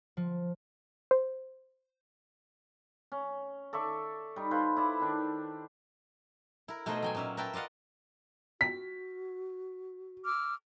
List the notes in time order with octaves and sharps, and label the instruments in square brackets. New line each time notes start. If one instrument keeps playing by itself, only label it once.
[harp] F3
[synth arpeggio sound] C5
[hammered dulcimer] C#4
A4 D5 E5 C#6
G3 D#4
F4 A4 B4 C5
E4 D5 A5
D#3 D4
[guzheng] E4 A#4
B2 A3 D#4 G#4 C5 D#5
F#3 G5 G#5
A#2 C#4 E5
A#4 B4 E5 G5 A5 C6
F4 D5 D#5 F5 F#5
[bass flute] F#4 [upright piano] B6
[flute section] D6 E6 F6